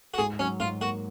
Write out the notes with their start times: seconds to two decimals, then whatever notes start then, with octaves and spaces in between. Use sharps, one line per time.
0.14 F#4
0.18 G#2 G#4
0.39 F#3 C#4
0.60 G#2 F4
0.81 A#3 F#4